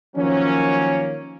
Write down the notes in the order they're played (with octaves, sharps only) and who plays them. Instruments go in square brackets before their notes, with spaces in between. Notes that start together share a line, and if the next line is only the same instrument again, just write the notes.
[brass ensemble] D#3 F3 F#3 A#3 C#4